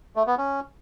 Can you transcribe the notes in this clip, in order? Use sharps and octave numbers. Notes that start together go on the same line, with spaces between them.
A3
B3
C#4